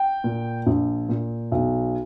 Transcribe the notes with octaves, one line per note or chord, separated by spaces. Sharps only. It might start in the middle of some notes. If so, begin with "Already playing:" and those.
Already playing: G5
A#2
A#1
A#2
B1